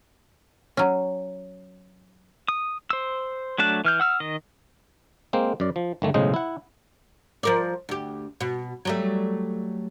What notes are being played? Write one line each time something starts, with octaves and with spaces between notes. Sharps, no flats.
F#3 C#4
D#6
C5 E6
F#3 A3 D4 A5 F#6
E3 F6 G6
F#5 E6 F6
D#3 D#5
G#3 A#3 C4 C5
F#2 D5
F3
G1 D#3 A3
B1 A2 C#3 G#3 C5 D#5
E4 F#5
F3 A#4 D5
D2 G4
B2
F#3 G3 A3